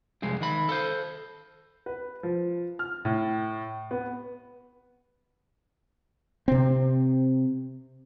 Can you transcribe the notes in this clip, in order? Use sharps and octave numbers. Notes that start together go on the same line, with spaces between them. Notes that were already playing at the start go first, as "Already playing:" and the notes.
C2 F2 G#3
D#3 B5
A4 C5
B4
F3
F6
A2
B3
C3 C4